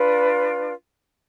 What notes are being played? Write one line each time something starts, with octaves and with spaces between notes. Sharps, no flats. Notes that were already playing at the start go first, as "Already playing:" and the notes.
Already playing: D4 F4 B4